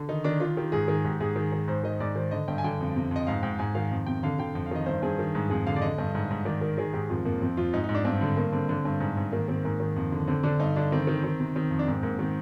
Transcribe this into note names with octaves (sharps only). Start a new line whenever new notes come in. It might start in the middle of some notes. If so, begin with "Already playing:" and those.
Already playing: D3
D#3 D#4
D#3 D4
D#3 F4
D#3 G4
G#2 G#4
D#3 G#4
G#2 G4
G#2 G#4
D#3
D#3
G#2 C5
D#3 D#5
G#2 D5
D#3 C5
D3 D#5
G2 G5
G#5
D3 G5
F2
C3
F2 D#5
G#2 F5
G#2 G5
G#2 G#5
D#3 F5
F2
C3 G5
D3 F5
D3 G5
F2 G5
F5
D#3 D#5
G2 C5
G2 G#4
D#3
G#2
F2 G#4
D3 F5
D5
D3 D#5
G2
G#2
G#2
D#3 D5
D#3 A#4
D#3 G#4
G#2 G4
F2 F4
F2 A#3
F2 C4
F2 F4
G#2 D#4
D#4
G#2
D4
G2 C4
D3
G2 A#3
D3 C4
D3
G2
G#2
G#2
D#3 A#3
D#3 C4
G#2 A#3
D#3
F2
D3
D3 C4
D3 D4
G2 D#4
D3 D4
D#3 C4
D#3
D#3
C3
D#3 C4
F2
D4
G#2 C4
G#2 A#3
D#3 C4